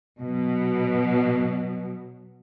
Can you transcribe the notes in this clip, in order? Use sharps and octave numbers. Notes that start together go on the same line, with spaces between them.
B2 F#3